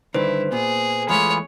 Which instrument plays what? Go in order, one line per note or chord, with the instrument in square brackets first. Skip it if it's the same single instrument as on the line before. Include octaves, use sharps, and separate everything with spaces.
[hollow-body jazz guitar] G2 D3 D#3 [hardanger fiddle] E4 [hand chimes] B4 C5
[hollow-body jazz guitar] A#2 B3 [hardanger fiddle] G#4
[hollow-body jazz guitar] E2 G#3 A3 [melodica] F4 G#4 B4 [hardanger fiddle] C#5